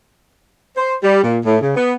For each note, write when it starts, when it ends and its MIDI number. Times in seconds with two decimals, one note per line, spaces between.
0.77 0.94 72
1.03 1.21 55
1.23 1.39 46
1.45 1.57 45
1.61 1.72 49
1.76 1.94 59